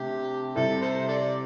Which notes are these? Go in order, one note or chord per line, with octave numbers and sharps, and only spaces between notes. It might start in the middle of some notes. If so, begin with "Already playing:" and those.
Already playing: C3 A3 D4 G4
C3 G3 E4 A4
A4 C5
A4 D5